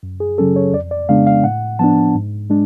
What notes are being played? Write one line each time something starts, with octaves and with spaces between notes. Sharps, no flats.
F#2
G#4
C#3 F#3 C#4 A4
C#5
F2 D5
D5
C#3 G#3 B3 D4 F5
F5
A2 F#5
F3 B3 D4 A5
G#2
G#3 D4